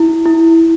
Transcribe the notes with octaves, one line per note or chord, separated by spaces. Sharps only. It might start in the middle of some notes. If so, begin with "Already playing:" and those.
Already playing: E4
E4